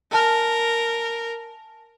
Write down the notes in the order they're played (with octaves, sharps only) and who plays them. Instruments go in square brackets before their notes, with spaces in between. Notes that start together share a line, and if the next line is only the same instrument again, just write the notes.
[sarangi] A#4 [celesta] G#5 A5 F6